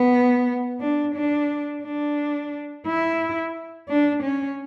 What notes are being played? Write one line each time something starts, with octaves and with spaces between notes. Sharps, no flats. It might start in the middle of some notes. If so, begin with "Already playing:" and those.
Already playing: B3
D4
D4
D4
E4
D4
C#4